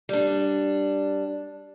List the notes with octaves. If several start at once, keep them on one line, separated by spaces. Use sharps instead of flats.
G3 D4